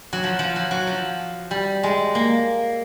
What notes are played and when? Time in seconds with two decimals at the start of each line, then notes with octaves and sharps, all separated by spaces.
0.13 F#3
0.24 F3
0.39 F3
0.56 F#3
0.71 F#3
0.87 F3
1.51 G3
1.83 G#3
2.15 A#3